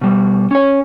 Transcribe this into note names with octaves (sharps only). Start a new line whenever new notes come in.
B2 G3
C#4 C#5